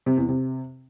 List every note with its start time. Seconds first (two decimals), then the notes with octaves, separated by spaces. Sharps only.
0.06 C3
0.17 E2
0.28 C3